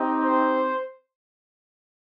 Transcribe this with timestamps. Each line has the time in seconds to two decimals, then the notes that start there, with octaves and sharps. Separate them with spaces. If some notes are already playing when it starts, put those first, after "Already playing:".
Already playing: C4 D#4 G4
0.23 C5